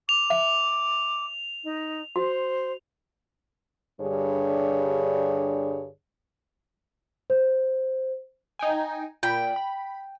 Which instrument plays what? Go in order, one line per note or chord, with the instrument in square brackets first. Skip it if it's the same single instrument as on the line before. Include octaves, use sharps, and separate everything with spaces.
[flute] D6 [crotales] F7
[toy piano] E5
[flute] D#4
[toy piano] F#4 [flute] C5
[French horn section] G2 D3 G3 G#4 C#5
[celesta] C5
[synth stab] D#4 G5 G#5
[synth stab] A#2 B5 [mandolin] G5
[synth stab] B5